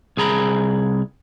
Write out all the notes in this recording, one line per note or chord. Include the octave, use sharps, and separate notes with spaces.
C2 G#4 A#5 B5